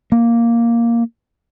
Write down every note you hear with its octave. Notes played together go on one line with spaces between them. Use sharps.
A#3